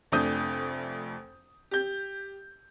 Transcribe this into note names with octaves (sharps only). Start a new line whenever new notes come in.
F1 F2 A3 D4 D#6 G6
G4 G6